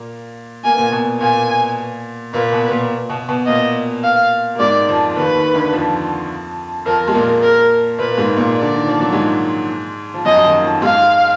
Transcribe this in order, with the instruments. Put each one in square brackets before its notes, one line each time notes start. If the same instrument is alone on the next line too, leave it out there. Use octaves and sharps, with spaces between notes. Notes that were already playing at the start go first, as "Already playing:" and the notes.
Already playing: [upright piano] A#2 A#3
[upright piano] A#3 [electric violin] G#5
[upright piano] B3
A#2 A#3
B2 B3
[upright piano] A#2 A#3 [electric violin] G#5
[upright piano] A#2 A#3 [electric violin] B4
[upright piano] B2 B3
A#2 A#3
B2 B3
B2 B3
[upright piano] A#2 A#3 [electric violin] D#5
[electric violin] F5
[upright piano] A#3
[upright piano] G#2 G#3 [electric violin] D5
[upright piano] F2 F3
[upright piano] D#2 D#3 [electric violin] B4
[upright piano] D#2 D#3
D2 D3
F2 F3
[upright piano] F2 F3 [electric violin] A#4
[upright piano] G#3
[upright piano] A#2 A#3 [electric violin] A#4
[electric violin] A#4
[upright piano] A#2 A#3 [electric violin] B4
[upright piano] G#2 G#3
A#2 A#3
[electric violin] D5
[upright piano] D3
D#3
F3
F#3
G#2 G#3
F3
[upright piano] F#2 F#3 [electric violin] D#5
[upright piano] F3
D#2 D#3
F2 F3
[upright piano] G#2 G#3 [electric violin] F5